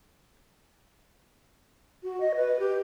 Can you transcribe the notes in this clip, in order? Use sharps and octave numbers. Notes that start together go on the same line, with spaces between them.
F#4
D#5
B4
G4